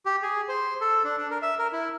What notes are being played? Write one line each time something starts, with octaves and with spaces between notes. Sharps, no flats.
G4
G#4
C5
A4
D4
D4
A#4
E5
A#4
E4